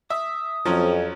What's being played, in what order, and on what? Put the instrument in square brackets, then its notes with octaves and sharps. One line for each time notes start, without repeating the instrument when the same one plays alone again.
[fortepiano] E5 [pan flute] D#6
[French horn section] F2 [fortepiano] F3 F#3 C#4